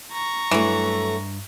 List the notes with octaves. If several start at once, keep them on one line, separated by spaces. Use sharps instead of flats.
A#5 C#6
G2 E3 F#3 A3